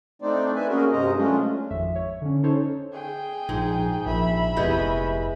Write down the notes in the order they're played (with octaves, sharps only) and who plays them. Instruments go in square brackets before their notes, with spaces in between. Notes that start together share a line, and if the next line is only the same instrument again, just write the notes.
[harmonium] A3 C4 D4 D#4 C5 D5
B4 E5 G#5
A#3 C#4 F#4 G#4 A#4
G2 C3 G#3 C5 D#5 A#5
F#3 G#3 A3 C#4 D4 F4
[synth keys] G#1 F2 E5
C#5
D3 C#4
C#4 D#4 A4 C5 C#5
[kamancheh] G#4 G5
[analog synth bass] A#1 [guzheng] G#2
[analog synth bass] A#1 [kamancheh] E5 B5
[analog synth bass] F1 [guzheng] G#3 B3 [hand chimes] E4 G4 G6